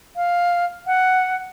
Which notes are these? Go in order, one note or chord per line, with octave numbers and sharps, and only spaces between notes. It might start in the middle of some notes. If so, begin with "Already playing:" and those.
F5
F#5